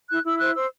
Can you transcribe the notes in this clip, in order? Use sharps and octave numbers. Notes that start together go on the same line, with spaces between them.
E4 F#6
E4 E6
C5 F#6
C5 E6